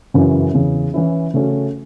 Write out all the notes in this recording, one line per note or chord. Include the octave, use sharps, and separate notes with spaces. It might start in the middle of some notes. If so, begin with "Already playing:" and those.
F#2 C#3 E3 C#4 F#4
E2 C#3 E3
E3 C#4 E4
C#3 A3 C#4 F#4